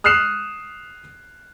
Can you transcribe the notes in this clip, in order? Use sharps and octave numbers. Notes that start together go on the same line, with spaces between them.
D#6 F6 F#6 C7 E7